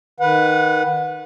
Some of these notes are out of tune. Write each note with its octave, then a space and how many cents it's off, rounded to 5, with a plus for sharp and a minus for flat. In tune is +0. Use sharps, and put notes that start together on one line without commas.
D#3 +0 B4 +0 F#5 -30